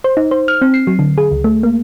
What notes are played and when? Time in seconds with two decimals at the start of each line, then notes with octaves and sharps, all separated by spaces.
0.04 C5
0.17 D#4
0.31 C5
0.48 F6
0.62 C4
0.74 C7
0.87 F#3
0.99 D3
1.18 G#4
1.32 C#2
1.44 A3
1.63 A#3